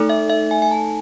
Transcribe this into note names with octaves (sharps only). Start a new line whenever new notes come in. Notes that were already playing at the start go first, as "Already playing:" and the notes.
Already playing: A3 D#4 A4
E5
E5
G#5
G#5
A5